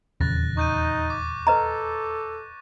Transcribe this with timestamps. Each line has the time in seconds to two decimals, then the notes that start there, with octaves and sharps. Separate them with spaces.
0.21 D#1 E2 C#3 F#6 A6 A#6
0.57 D#4 C#6 G6 D#7
1.10 D6
1.47 A4 B4 D#5 A#5